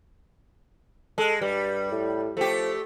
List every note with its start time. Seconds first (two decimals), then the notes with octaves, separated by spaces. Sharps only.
1.18 G#3 A4
1.41 G2 G3
1.91 A2
2.37 F3 A3 G4